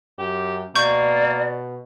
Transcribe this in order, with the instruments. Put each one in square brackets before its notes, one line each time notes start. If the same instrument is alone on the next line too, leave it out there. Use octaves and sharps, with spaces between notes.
[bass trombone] F#2 [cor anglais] G4
[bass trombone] B2 [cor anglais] A#3 [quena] D5 [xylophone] C#6 G6